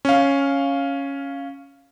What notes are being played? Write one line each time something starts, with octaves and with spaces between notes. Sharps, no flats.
C#4 F5